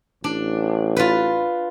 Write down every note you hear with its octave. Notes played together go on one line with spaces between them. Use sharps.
A1 D4
F4 B4